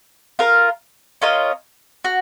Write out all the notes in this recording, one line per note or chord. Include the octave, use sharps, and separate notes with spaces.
F4 A#4 F5
C#4 F4 A#4 D#5
F#4